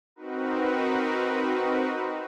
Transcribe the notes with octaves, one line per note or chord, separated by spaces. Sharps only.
C4 D#4 F#4 A#4 B4